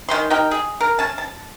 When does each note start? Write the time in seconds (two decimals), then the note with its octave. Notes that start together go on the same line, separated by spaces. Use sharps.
0.09 D#3 C#4 C6
0.30 D#4 G4 A#4 G5
0.51 G#4
0.81 A#4
0.99 C#4 A5
1.18 A5